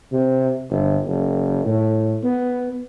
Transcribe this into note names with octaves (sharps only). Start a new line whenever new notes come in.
C3
G1
F#1
A2
B3